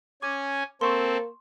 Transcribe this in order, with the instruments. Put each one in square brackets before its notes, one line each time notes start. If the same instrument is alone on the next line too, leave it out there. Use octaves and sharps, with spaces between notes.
[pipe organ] C#4 G#5 [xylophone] D6 G#6
[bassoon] A#3 [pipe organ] C4 A4 [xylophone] C6 C#6